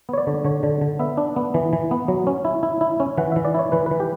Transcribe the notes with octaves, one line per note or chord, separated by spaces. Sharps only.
B3 C#5
D5
D3
D3 C#5
D3
D3
B3 E5
D4
B3
E3
E3
B3
F#3
C#4
E4
E4
E4
C#4
E3 F#5
E3 E5
D5
E4 C#5
E3 B4
E3 B4
G4